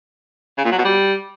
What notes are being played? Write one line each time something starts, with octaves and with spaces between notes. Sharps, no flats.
C#3
A#2
F#3
B2
G3